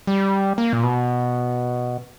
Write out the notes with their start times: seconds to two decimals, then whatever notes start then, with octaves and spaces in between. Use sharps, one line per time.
0.07 G3
0.58 A#3
0.73 A#2
0.83 B2